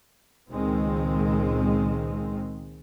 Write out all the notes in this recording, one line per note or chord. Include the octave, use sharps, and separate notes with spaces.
C#2 A#2 D#3 G#3 C4